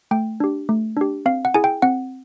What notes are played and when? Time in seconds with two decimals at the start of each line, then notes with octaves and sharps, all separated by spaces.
0.11 A3 G5
0.40 D4 G4
0.69 A3
0.97 D4 G4
1.26 C4 F5
1.45 F#5
1.54 E4 G#4 G#5
1.64 G5
1.82 C4 F#5